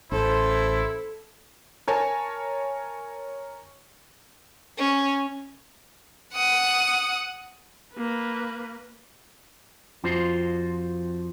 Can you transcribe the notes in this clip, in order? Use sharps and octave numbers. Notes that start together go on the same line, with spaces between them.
A1 E4 A4 C5
A#4 C#5 G#5 A5
C#4
F#5 D#6
A#3 B4
F2 F4 F#4 C5